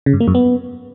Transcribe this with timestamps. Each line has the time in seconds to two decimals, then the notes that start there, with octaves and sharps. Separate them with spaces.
0.06 C#3
0.13 G2
0.20 A#3
0.28 F#2
0.35 B3